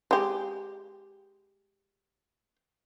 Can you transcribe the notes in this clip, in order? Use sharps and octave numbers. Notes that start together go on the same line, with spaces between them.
G#3 G4